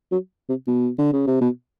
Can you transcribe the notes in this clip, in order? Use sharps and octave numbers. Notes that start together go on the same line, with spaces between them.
F#3
C3
B2
D3
C#3
C3
B2